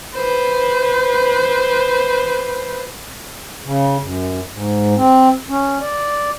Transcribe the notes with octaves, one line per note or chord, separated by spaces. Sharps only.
B4 C5
C#3
F#2
G#2
C4
C#4
D5